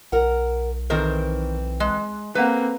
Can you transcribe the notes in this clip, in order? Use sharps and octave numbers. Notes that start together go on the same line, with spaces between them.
B1 A#4 F#5
D#3 E3 C4 A4 A#4 C5
G#3
A#3 C4 A4 B4 F#5